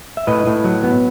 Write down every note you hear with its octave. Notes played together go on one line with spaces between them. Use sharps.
E5
A2 B4 D#5
A2
F#3
B3